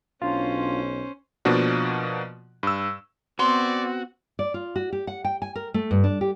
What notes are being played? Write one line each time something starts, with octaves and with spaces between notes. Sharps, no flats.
B1 C#4 D4 F4 C5
B2 F3 A#3 D4 F#4
G2 E6
B3 C4 F#4 D5 C6
D5
F4
F#4
G4
F#5
G5
G#5
A#4
A3
G2
D4
G4